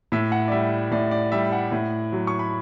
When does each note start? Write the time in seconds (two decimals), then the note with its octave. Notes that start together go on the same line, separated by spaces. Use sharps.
0.12 A2 E5
0.32 F#5
0.48 D5
0.51 G3 E5
0.91 A2 D5
1.11 D5
1.32 G3 E5
1.52 F#5
1.72 A2
2.12 F#3
2.27 C#6
2.39 B5